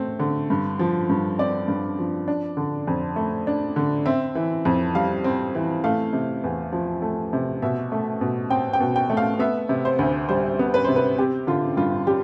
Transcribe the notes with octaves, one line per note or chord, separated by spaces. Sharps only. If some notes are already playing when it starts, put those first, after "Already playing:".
Already playing: A3 C4
D3
G2
F3
G2
C4 D5
G2
F3
D4
D3
F2
A3
D4
D3
C4 E5
E3
F2
G3 F5
C4
E3
A3 F5
C3
E2
F3
A3
C3
B2 E5
A3
B2
C4 G5
G5
B2
G5
A3
F5
B3 E5
C3
C5
D2
G3 C5
B3
B4
C3 C5
B4
C4 G4
D3 F4
G2 F4
G3 G4